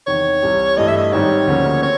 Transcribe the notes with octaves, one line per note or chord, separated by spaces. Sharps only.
E2 C3 D#3 C#5
C2 C3 E3 G3
G2 E3 A3 D#5
E5
D#5
G#2 D#3 G3 C4 D#4 C#5
D2 C#3 F3 A#3
C4 C#5